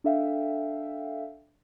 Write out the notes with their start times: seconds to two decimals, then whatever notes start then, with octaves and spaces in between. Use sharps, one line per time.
0.04 D4 A4 E5 F5 G5